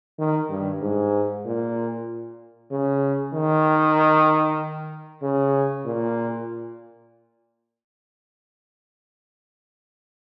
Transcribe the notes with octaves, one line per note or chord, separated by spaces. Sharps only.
D#3
G2
G#2
A#2
C#3
D#3
C#3
A#2